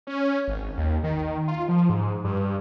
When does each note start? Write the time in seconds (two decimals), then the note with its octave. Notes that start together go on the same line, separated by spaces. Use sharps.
0.07 C#4
0.48 G#1
0.77 D#2
1.03 D#3
1.48 F4
1.69 F3
1.90 G#2
2.24 G2